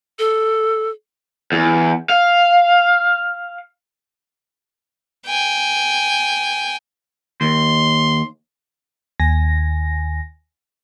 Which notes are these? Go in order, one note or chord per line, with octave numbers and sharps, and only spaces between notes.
A4
E2
F5
G5 G#5
D#2 C6
D#2 G#5 A#6